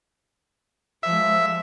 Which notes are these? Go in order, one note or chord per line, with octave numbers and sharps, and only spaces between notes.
F3 G#3 E5